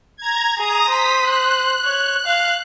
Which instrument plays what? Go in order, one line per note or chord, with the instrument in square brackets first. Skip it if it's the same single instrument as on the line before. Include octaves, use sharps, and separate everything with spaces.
[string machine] A#5 G#6
[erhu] G#4 [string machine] A#5 D#6 A#6
[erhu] C5 [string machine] D#6 B6
[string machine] F#6
[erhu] C#5
F5